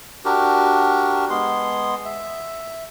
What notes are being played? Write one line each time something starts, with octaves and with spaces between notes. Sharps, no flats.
D4 F#4 G4 A#4
G#3 B3 C6
E5